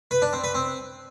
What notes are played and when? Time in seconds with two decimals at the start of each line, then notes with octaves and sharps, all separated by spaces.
0.11 B4
0.22 D4
0.33 C4
0.44 B4
0.54 C4